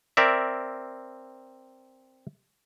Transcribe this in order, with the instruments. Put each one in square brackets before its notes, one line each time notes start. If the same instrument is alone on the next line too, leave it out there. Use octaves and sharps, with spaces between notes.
[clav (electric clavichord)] C4 A#4 D5 E5